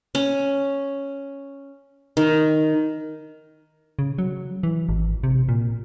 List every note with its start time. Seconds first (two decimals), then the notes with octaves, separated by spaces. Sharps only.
0.15 C#4
2.17 D#3
3.99 C#3
4.18 F#3
4.63 E3
4.89 G#1
5.23 C3
5.49 A#2